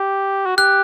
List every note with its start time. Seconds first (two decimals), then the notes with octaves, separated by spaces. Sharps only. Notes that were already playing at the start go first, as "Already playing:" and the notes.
Already playing: G4
0.46 F#4
0.57 G4 F#6